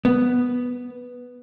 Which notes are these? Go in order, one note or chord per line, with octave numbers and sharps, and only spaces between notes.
B3